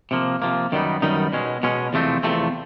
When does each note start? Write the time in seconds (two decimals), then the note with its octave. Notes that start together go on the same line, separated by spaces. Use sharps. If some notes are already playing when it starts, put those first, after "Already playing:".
0.11 C3 F3 A#3
0.42 C3 F3 A#3
0.72 F#2 D#3 G3 B3 D#4
1.02 F#2 D#3 G3 B3 D#4
1.33 B2 G#3 C#4
1.63 B2 G#3 C#4
1.93 E2 C3 F3 A3 C4
2.23 E2 C3 F3 A3 C4